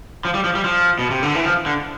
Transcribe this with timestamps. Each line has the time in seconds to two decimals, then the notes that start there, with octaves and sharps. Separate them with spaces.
0.25 F3
0.34 G3
0.44 F3
0.55 G3
0.64 F3
0.99 B2
1.10 C3
1.23 D3
1.34 E3
1.46 F3
1.66 D3